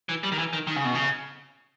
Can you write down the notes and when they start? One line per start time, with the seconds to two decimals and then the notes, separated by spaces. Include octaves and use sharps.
0.09 E3
0.23 G3
0.32 D#3
0.38 E3
0.53 D#3
0.67 D#3
0.76 C#3
0.85 B2
0.95 C#3